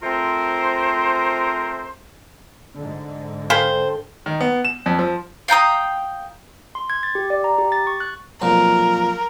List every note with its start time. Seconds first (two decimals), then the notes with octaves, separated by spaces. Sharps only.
0.03 A3 C4 F4 A#4 C5
2.76 G#2 D3
3.50 A4 C5 F5 G5 G#5 B5
4.26 D#3
4.41 B3
4.65 E7
4.86 F2
4.99 F3
5.48 F5 G5 A#5 D#6
6.75 C6
6.90 G#6
7.03 A6
7.15 G4
7.30 D5
7.44 A#5
7.58 G4
7.72 A6
7.87 C#6
8.00 F#6
8.42 B1 F2 A#2 A#4